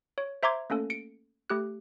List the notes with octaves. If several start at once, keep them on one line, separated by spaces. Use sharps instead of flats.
C#5
C5 E5 A#5 C6 D6 G#6
A3 A#3 C#4 A4
C#7 D7
A3 G4 F#6